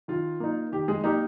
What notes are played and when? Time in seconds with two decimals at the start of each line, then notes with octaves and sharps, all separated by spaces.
0.08 D#3 F4
0.40 A#3 D#4
0.72 D#3 G4
0.88 G#3 G#4
1.04 A#3 D#4 G4